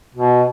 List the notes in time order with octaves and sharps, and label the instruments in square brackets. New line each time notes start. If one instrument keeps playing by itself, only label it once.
[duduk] B2